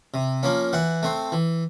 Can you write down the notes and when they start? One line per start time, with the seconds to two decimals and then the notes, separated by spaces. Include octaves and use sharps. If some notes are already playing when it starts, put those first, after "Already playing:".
0.14 C3
0.43 F3 A#3 C#4
0.73 E3 F#5
1.03 A3 C4
1.32 E3